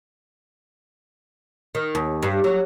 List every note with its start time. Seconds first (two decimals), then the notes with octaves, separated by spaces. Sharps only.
1.75 D#3
1.95 D#2
2.23 G2
2.44 F#3